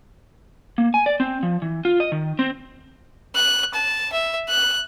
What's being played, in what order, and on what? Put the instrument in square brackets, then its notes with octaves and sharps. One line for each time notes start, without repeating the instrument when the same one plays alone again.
[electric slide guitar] A#3
G#5
D5
C4
F3
E3
F4
D#5
D#3
C4
[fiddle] F#6
A5
E5
F#6